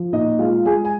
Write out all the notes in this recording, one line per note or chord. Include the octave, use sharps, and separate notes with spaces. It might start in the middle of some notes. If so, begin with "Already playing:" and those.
Already playing: F3
A#2 D#4 D#5
G#3 F4 F5
G#3 G#4 G#5
G#5